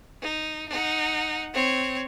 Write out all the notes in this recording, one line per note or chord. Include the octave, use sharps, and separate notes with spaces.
D#4
D#4 F#5
C4 C#5